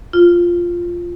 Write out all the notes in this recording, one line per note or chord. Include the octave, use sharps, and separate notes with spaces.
F4